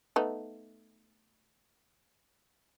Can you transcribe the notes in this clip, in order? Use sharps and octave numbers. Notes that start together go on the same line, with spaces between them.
A3 B3 D#4